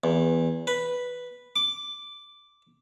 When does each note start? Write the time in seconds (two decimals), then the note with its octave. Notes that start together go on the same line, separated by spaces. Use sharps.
0.04 E2
0.67 B4
1.56 D6